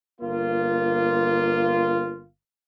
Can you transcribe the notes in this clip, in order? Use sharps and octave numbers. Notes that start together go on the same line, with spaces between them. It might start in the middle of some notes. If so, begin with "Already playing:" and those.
G1 A#3 F4